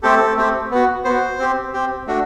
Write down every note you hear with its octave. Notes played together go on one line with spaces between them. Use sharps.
A3 C4 G4 A4
A3 C4 G4
B3 F#4
B3 F#4 C5
C4 G4
C4 G4
A3 D4 F#4